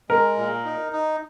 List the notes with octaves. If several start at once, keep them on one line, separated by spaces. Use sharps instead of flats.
G#3 A#4
A#2
D#4
D#4